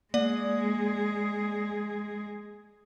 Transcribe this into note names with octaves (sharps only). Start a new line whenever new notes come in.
G#3 A#3 G#4 D5